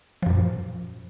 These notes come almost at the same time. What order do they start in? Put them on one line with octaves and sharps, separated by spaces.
F3 F#2 A#2